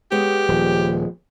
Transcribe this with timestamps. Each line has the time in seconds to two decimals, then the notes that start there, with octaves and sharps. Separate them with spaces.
0.11 G#3 B3 G4 C#5
0.48 D#1 F3